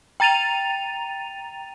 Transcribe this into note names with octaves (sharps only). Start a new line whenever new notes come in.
G5 A#5 A6 D#7 F7